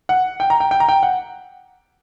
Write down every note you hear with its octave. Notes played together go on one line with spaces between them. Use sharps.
F#5
G5
A#5
G5
G5
A#5
G5
F#5